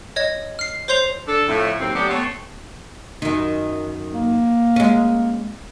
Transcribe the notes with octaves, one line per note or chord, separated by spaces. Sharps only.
C#5 D#5 G#6
F6 C7
C5 C#5 C6 G6 C7 F7
D4 A4
F2 A2
D#2 F#3 C4
F#3 A3 B3 D4 F#4 G4
A3 B3 C4 A4 C#5
F#2 D#3
A#3
G#3 C#4